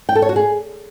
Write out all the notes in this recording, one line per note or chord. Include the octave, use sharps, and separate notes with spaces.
G5
A4
C#5
F#4
G#4